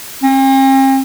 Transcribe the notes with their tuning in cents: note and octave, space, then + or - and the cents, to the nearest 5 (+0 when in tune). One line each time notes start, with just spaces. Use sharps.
C4 +45